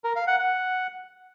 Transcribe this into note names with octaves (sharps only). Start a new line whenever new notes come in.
A#4
F5
F#5
F#5